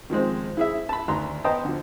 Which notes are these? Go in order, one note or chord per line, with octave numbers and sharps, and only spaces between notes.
D#3 F3 G#3 C4
E4 G#4 E5
A5 B5
D2 D#3 A#5 C6
B3 C5 D#5 G5 A5 A#5
D3 F3